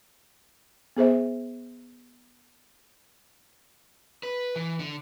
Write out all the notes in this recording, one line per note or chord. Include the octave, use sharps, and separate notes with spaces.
B3 G#4 C5 E5
B4
E3
D3